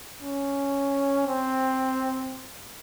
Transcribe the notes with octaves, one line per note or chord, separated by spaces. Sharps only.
C#4
C4